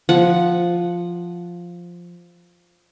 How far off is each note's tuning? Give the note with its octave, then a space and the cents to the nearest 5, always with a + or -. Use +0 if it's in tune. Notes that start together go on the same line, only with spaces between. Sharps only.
F3 +0 F#5 +0